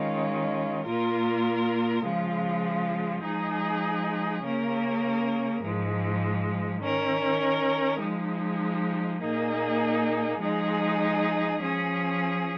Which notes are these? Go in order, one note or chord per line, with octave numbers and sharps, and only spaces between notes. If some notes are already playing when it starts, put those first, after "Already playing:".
Already playing: D#3 G#3 C#4 F4
A#2 A#3 F4 A#4
C#3 F3 G#3 F4
F3 G#3 D#4 G#4
C#3 A#3 C#4 A#4
G#2 F3 G#3
D#3 C#4 A#4
F3 G#3 D#4
A#2 A#3 D#4 G#4
F3 G#3 D#4 G#4
F3 C#4 G#4